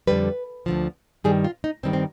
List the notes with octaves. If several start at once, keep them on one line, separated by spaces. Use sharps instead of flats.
F2 D3 G3 B4
D2 D3 F3
G2 D#3 G3 G#4
F4
D#4
G2 D#3 G3 C4
C4